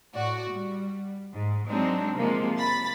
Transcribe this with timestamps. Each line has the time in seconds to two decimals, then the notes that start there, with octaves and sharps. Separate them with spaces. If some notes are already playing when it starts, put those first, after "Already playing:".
0.14 A2 F#4 D5
0.51 G3
1.33 G#2
1.69 F#3 G#3 C4 D4 D#4
2.15 C3 F3 G#3 A#3
2.58 B5 A6